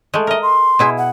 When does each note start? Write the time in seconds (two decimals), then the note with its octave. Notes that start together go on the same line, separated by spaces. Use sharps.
0.14 G#3 A3
0.27 A#4 D#5 E5
0.42 C6
0.79 B2 E4 G#4
0.98 F#5